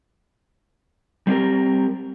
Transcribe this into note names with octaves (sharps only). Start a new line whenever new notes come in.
G3 C4 G4 A#4